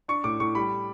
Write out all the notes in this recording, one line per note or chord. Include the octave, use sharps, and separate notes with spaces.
D4 C#6
A2 D6
A2 C#6
G3 B5